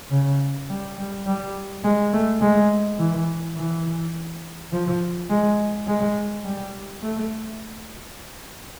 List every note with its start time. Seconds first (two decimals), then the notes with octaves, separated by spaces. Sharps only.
0.11 C#3
0.69 G3
0.98 G3
1.26 G3
1.84 G#3
2.13 A3
2.41 G#3
2.99 E3
3.57 E3
4.72 F3
5.29 G#3
5.87 G#3
6.44 G3
7.02 A3